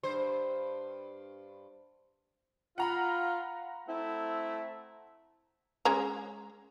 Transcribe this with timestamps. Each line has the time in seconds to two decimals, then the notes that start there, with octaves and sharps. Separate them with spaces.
0.03 G2 C5
2.78 F4 F#5 A#5 B5
3.87 A3 C4 E4
5.85 G#3 C#4 A#5